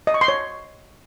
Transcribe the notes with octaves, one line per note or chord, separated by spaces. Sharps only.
D#5
C#6
C6
C#5